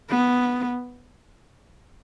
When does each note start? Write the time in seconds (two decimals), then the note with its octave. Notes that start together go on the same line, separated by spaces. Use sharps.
0.10 B3